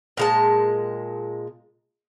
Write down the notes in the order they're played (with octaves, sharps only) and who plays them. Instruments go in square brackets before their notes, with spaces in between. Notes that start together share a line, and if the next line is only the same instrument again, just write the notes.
[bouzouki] A#2 G#3 A5